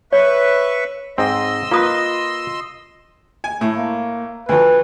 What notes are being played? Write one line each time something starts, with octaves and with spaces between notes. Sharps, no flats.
B4 C#5 E5 C#6
G#2 C4 D#5 C6 E6
A#3 F4 B4 D#6
G#5
A2 A3
A#3
D2 F3 B4